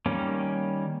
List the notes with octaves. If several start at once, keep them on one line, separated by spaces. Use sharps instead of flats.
D#3 G3 A#3 C#4